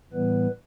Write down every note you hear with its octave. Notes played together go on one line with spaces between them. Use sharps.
A2 E3 G3 B3 B4